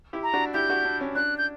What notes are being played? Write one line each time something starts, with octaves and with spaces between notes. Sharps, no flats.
E4 G4
A#5
D4 F#4
E4 G4 G6
D4 F#4
D4
C#4
D4 F#6
G6